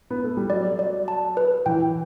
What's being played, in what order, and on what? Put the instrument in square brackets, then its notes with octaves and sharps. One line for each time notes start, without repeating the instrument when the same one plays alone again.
[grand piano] B3
A3
G3
[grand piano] F#3 [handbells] D5
[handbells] D5
A5
B4
[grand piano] E3 [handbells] G5